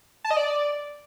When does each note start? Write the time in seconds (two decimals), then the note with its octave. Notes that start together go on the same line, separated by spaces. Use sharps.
0.25 A5
0.31 D#5
0.37 D5